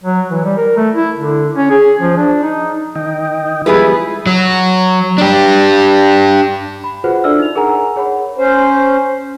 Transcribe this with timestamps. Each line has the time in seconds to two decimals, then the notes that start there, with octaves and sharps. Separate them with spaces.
0.04 F#3
0.31 E3
0.44 G3
0.57 A#4
0.77 A3
0.95 E4
1.18 D3
1.55 C#4
1.71 G#4
2.01 F3
2.17 D4
2.43 D#4
2.95 D#3 D#5 G5
3.66 F3 G3 G#3 B3 E4 G#4 B4
4.26 F#3
5.18 D4 G4
6.84 B5
7.04 F4 F#4 G#4 B4 C5 F#5
7.24 D4 A4 D5 E5 E6 F6
7.39 D#4 F7
7.55 G#4 A#4 F#5 G#5 A#5
7.96 G#4 C#5 F#5 B5
8.38 C#4 C5